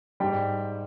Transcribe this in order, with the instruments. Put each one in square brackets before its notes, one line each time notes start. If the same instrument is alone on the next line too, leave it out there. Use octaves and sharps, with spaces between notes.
[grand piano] G#2 G3 G5